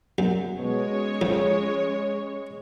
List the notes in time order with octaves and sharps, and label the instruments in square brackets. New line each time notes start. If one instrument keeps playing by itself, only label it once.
[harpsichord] F#2
[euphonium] B2 [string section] G#3 C#5
[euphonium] C#4
[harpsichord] F2 F3